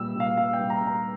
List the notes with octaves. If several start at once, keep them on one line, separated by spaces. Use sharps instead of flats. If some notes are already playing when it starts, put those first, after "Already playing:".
Already playing: A#2 G3 E6
G3 F5
G3 F5
G5
G3
A#5
G3
A#5